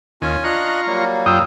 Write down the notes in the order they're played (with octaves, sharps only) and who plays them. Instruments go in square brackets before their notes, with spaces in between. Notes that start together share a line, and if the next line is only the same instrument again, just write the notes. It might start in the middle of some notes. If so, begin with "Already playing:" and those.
[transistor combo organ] D#2 [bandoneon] C#4 F4 G#5
[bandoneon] D4 D#5 F#6 [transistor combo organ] F4 A#5 C#6
[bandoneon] F#3 G3 A#3
[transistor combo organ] F#2 F4 G5 [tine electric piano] D#6 E6